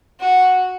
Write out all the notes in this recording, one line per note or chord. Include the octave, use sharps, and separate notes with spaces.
F#4